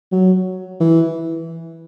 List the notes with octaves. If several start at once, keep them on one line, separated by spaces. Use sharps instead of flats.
F#3
E3